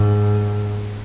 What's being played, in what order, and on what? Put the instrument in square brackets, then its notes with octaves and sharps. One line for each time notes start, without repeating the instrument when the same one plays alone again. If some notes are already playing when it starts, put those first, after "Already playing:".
Already playing: [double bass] G#2